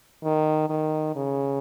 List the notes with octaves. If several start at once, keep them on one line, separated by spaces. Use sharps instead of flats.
D#3
D#3
C#3